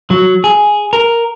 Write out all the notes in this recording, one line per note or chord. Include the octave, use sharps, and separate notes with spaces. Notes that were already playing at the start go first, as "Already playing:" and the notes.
F#3
G#4
A#4